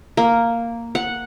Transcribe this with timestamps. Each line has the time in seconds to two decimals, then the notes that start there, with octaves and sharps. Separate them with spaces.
0.17 A#3
0.95 F#5